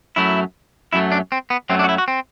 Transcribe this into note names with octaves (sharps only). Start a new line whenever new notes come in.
F#2 F#3 A3 E4
F#2 F#3 A3 E4
D4
C4
B3
F#2 F#3 A3 C4
D4
F#4
E4
F#4
C4